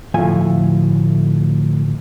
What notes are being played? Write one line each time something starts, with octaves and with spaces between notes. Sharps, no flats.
D2 A2 F3 A3 F4 G#5